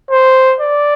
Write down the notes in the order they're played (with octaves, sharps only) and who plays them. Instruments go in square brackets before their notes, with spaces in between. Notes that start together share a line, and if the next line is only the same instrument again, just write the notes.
[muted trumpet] C5
D5